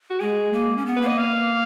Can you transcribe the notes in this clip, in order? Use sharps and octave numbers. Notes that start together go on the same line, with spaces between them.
F#4
G#3 G#4
A#3
C#4
B3
B4
A#3 D#5
F5